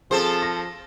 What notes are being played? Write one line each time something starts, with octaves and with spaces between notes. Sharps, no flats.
F3 C4 G#4 A4 C5
A#6